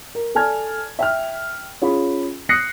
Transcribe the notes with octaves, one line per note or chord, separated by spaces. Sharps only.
A#4
A4 D5 G#5 A5 F6 G#6
E5 G5 F6
C#4 F4 G#4 B5
D#6 F#6 A#6 C7 C#7